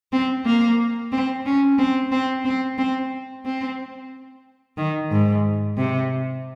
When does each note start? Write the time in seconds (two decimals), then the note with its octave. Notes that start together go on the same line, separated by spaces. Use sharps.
0.12 C4
0.46 A#3
1.12 C4
1.46 C#4
1.78 C4
2.12 C4
2.45 C4
2.78 C4
3.45 C4
4.77 D#3
5.11 G#2
5.78 C3